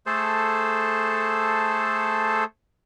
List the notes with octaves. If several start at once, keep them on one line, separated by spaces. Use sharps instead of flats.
A3 G#4 A4 C5